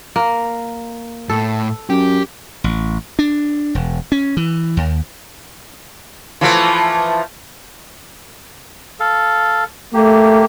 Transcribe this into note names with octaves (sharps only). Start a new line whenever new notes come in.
A#3
A2 A4
F#2 G4
A1
D4
E1
C#4
E3
D#2
E3 F3 A3
A4 F5
A3 A#3 G4